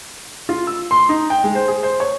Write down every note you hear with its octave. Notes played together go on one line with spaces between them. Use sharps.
F4
E6
C6
D#4
G5
G#3
C5
G#4
C5
C#5